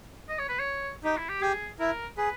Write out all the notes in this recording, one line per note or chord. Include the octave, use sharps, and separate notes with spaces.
D#5
C#5
B4
C#5
D#4 G4
E4
G4
G4 G#4
E4 A#4
G#4 B4